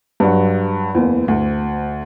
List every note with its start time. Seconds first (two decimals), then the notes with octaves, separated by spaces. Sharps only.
0.20 G2 F#3
0.95 F#1 E2
1.28 D2